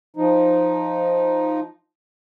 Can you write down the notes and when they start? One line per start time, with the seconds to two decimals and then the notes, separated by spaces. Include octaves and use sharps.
0.16 F3 D#4